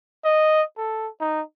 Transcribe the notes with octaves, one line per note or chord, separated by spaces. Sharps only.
D#5
A4
D#4